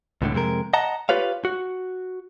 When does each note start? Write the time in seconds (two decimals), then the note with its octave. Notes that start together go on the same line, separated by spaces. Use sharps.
0.22 C#2 A2 D3
0.34 F2 C3 G#3 A#4
0.74 D#5 F#5 A5 A#5
1.09 F4 G4 B4 C#5 F5
1.45 F#4